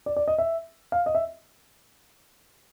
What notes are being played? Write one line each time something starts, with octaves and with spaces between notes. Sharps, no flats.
D5
D5
D#5
E5
F5
D#5
E5